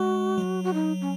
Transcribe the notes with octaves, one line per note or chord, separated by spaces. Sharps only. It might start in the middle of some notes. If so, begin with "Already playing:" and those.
Already playing: G#3 F#4
F#3
F#4
D#4
C#4